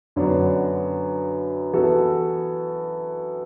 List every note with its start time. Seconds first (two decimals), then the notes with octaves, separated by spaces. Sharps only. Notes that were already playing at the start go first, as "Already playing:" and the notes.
0.16 F#2 D3 F#3 B3 D4
1.73 E3 B3 F#4 A4